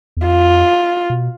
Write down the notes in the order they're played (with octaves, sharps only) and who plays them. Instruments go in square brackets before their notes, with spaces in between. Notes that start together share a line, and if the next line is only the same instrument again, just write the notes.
[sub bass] E2
[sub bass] F2 [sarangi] F4
[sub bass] B2